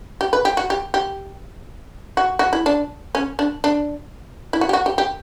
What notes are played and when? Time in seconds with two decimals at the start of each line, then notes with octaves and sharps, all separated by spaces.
0.21 G4
0.33 B4
0.45 G4
0.57 F#4
0.70 G4
0.94 G4
2.17 F#4
2.39 F#4
2.53 E4
2.66 D4
3.15 C#4
3.39 D4
3.64 D4
4.53 E4
4.61 F#4
4.69 G4
4.73 F#4
4.86 G4
4.98 G4